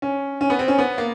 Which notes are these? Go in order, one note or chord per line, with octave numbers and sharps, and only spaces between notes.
C#4
C#4
B3
C4
C#4
B3
A#3